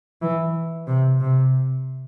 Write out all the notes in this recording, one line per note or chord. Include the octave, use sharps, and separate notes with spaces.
E3
C3
C3